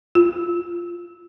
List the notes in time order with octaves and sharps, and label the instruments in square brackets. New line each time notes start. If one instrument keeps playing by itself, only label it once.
[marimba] F4